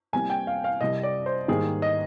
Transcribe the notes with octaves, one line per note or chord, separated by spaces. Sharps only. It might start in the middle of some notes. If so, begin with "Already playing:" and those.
C2 C3 G3 A#3 G#5
G5
F5
F5
C2 C3 G3 D#5
D5
C5
G#2 D#3 G3 A#3 G#4
D#5